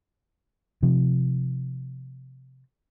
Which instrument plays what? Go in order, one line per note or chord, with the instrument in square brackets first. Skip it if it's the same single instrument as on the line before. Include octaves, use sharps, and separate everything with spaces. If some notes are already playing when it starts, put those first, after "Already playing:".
[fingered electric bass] C3 F3